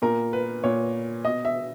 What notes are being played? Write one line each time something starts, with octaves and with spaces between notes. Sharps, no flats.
A#2 A#4
B4
A#2 C#5
B2 D#5
E5